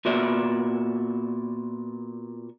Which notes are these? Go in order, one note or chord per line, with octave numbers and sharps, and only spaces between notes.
A#2 B3 F#4 D5 E5